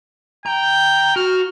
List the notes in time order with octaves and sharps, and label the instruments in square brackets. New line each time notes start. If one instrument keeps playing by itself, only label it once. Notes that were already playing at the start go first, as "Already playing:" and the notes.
[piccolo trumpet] G5 [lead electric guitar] A#5
[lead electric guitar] F#4 [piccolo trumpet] F6